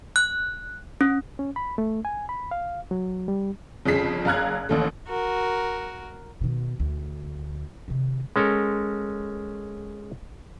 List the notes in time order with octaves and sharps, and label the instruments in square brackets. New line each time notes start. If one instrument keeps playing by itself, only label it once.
[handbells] F#6
C#4
[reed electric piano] C#4
B5
A3
G#5
B5
F5
F#3
G3
[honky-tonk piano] G1 F2 C#3 G#4 B6 C7
F#1 F5 A#5 F#6 G#6
A1 D#2 A3
[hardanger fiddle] F#4 A#4
[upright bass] B2 D#3
D2
C3 D#3
[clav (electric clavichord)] G#3 C#4 A4 A#4